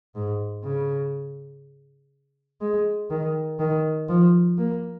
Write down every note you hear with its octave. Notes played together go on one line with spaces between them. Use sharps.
G#2
C#3
G#3
D#3
D#3
F3
A#3